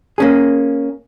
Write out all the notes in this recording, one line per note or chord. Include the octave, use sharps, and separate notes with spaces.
A#3 C#4 G#4